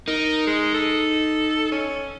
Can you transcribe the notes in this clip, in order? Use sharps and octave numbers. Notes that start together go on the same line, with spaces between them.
D#4 A#4
G#3
A4
C#4